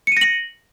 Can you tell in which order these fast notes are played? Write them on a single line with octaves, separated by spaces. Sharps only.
C#7 D#7 A#6 F#7